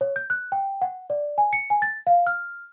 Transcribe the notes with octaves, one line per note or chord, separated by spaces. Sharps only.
C#5
G6
F#6
G5
F#5
D5
G#5
C#7
G#5
A6
F5
F6